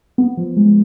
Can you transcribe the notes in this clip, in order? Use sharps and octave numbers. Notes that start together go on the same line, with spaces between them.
B3
F3
G#3